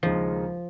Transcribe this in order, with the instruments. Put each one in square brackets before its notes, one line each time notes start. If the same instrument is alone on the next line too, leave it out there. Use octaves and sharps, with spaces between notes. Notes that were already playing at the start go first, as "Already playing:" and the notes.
[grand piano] D#2 C#3 G#3 D#4 A#4 [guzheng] F3